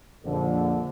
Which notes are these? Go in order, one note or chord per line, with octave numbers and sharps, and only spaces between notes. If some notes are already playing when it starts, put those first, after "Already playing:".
A#1 F2 D3